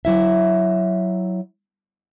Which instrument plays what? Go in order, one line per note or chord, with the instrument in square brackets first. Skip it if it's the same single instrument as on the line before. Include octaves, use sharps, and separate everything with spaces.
[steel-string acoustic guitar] F#3 E4 E5